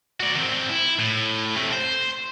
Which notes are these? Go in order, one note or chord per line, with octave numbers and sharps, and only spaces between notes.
F#4 D5
D#3 C4
E4
A2
C3 A3
C5